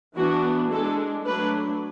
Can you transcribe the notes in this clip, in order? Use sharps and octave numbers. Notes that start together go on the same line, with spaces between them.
E3 B3 D4 F#4
G#3 D4 A4
F#3 A3 D4 B4